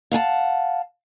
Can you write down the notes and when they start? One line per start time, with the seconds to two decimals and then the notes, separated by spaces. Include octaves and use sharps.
0.12 F5 F#5 G#5 A5